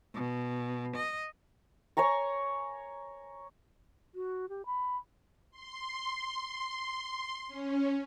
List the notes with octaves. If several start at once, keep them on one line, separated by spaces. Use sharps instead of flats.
B2
D#5
C#5 G#5 A#5 C#6
F#4
G4
B5
C6
C#4